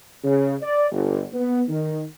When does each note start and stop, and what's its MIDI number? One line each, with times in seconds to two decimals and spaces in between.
0.24 0.55 49
0.61 0.91 74
0.91 1.23 31
1.32 1.62 59
1.69 2.03 51